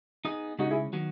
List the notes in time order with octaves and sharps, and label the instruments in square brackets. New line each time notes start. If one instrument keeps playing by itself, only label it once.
[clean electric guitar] B3 D#4 G#4 D#5
[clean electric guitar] C#3 G#3 C#4 [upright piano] D#4 F#4
[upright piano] E4 G#4
[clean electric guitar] D#3 F#3 B3 F#4